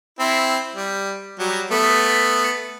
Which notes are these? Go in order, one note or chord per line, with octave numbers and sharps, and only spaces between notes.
C4 E4
G3
F#3 G3
A3 B3